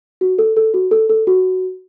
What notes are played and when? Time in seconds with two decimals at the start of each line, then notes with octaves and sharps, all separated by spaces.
0.21 F#4
0.39 A4
0.57 A4
0.74 F#4
0.91 A4
1.09 A4
1.27 F#4